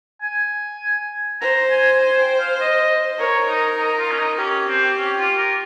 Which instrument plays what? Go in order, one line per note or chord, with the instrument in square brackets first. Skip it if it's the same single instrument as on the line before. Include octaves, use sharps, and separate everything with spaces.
[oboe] G#5
[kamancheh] C5 [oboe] A#5
[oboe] G#5
G#5
G5
F5
D#5
[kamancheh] A#4 [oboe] C#5
[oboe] D#4
D#4
F4
C#4
D#4
[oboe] C#4 [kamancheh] G4
[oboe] C4
C#4
F4
A#4